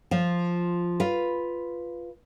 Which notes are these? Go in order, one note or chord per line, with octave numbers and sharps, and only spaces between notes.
F3 F4
F4 B4